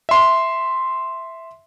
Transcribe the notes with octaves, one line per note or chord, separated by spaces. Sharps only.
E5 C6